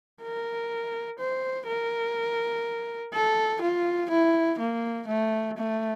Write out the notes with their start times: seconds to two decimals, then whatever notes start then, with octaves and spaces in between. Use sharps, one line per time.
0.22 A#4
1.19 C5
1.67 A#4
3.14 A4
3.62 F4
4.10 E4
4.59 A#3
5.08 A3
5.57 A3